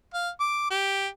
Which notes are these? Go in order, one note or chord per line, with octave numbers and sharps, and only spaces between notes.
F5
D6
G4